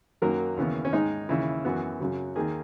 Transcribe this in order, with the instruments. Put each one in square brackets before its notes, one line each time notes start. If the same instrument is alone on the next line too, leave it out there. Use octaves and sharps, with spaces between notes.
[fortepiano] F#2 D#3 F#3 A#3 A#4
D#2 C#3 E3 B3
C#4
G#2 D#3 G#3 D#4
D#2 C#3 E3 E4
F#2 E3 B3 F#4
F#2 C#3 F#3
D#2 D#3 A#3 G#4